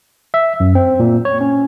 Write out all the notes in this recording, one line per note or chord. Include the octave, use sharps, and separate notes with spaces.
E5
F#2
C4
A#2
C#5
C#4